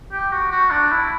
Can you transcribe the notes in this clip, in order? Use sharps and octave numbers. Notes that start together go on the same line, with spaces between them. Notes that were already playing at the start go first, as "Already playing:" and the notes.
G4
F#4
F#4
D4
E4